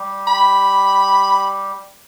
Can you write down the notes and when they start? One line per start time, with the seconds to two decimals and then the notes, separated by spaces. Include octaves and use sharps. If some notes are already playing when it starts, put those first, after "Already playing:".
Already playing: G3 G4
0.27 B5